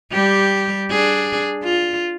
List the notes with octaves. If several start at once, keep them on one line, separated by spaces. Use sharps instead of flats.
G3 G4
D4 G#4
F4